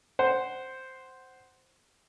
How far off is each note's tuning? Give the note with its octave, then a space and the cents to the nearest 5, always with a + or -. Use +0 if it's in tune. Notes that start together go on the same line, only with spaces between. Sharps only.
C5 +0 F#5 +15